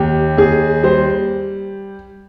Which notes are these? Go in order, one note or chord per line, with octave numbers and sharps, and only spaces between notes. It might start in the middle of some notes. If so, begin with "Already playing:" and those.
Already playing: D#2 G4
D#2 G#4
G3 C5